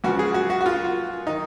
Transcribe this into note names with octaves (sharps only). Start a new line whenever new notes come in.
C#2 C#3 F3 F#4
G#4
F#4
F#4
F#4
F4
D#3 D#4